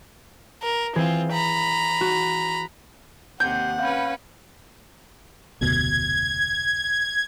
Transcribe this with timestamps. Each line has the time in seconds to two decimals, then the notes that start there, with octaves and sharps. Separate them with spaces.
0.62 A#4
0.96 E3 C4 F4 G#4
1.32 A#5 B5
2.01 F#4
3.40 D#2 C3 F#5 G6
3.79 C#4 B4 F5 B5
5.61 F1 D2 B2 G#6